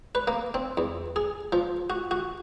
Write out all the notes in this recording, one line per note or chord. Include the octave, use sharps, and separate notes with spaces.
B4
A#3
C4
E2
G#4
F3
F#4
F#4